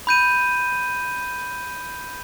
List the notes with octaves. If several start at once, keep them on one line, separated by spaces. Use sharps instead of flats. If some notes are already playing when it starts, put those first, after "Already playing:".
B5 G6 D#7